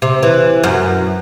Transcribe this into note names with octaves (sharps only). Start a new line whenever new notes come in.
C3
E3
F#2